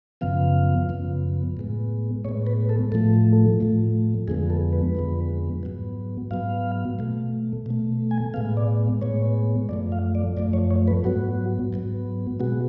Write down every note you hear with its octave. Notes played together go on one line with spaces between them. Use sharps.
F#2 C#3 F3 B3 F5
F#2 C#3 F3 B3
A2 G#3 B3
A2 G#3 B3 C#5
B4
A4
A2 F3 A3 A4
A2 F3 A3
F2 D3 F3 G#3 B3 G#4
A4
B4
F2 D3 F3 G#3 B3
G#2 F#3 B3
G#2 F#3 B3 F5
B2 A3
B2 A3
G#5
A2 G#3 B3 F5
D5
A2 G#3 B3 C#5
F#2 F3 A3 D5
F5
D5
F#2 F3 A3 D5
C#5
C#5
B4
G#2 F#3 B3 F#4
G#2 F#3 B3
B2 G#3 B3 F#4